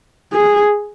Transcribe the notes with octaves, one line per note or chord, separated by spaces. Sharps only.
G#4